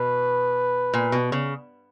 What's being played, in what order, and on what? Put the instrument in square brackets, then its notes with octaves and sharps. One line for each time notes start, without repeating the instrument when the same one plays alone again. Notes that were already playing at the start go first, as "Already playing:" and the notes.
Already playing: [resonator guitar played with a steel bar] B2 [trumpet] B4
[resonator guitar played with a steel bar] A#2
B2
C#3